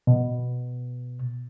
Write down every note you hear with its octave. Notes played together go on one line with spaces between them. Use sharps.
B2